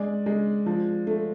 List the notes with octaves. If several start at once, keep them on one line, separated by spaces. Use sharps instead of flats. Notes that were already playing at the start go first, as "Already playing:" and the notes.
Already playing: G#3 D5
G#3
F3
A3